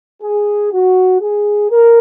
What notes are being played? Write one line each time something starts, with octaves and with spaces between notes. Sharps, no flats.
G#4
F#4
G#4
A#4